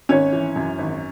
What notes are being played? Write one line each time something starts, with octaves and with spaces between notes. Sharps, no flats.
G#1 C#4 C#5
E3
F#2
G#1